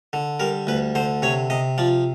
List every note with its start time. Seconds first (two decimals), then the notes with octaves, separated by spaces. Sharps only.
0.13 D3
0.40 G3 A#4
0.67 D2 B4
0.95 D3 C5
1.22 C3 C#5
1.50 C3 D#5
1.78 F3 D5